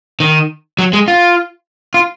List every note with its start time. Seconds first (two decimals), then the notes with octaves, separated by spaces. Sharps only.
0.20 D#3
0.79 F#3
0.93 G#3
1.08 F4
1.94 F4